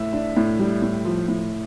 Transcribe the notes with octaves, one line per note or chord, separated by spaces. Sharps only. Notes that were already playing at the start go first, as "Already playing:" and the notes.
Already playing: A2 E5
D4
A2
G3
A2
F3
A2